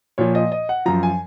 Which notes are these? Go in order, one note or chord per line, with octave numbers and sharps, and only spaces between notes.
A#2 F3 C#5
D#5
D#5
F#5
F#2 F3 A#5
G#5